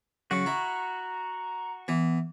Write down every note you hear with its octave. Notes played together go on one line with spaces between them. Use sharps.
C#3 F#3 F#4 C#6
E4 A#5
E3 B3